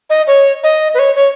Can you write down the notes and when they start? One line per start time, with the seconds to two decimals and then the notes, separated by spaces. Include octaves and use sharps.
0.10 D#5
0.27 C#5
0.63 D#5
0.94 B4
0.99 C#5
1.15 C#5